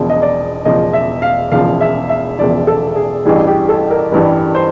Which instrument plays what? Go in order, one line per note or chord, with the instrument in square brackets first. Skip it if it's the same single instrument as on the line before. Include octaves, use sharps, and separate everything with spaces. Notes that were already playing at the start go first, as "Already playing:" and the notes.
Already playing: [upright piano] E1 E2 C#3 F3 D5
D#5
D5
E1 E2 C#3 F3 D#5
E5
F5
E1 E2 C#3 F3 F5
E5
E5
E1 E2 C#3 F3 D5
A4
G#4
A1 G2 E3 G3 G#4
G4
A4
A#4
A1 G2 E3 G3 B4
C5